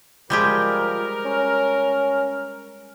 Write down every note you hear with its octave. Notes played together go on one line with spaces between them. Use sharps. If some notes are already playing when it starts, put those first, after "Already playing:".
F3 G3 G#3 G4 A#4
C#4